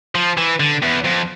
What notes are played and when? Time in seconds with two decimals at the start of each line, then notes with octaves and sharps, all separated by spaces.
0.15 F3
0.37 E3
0.60 D3
0.83 E2
1.05 F2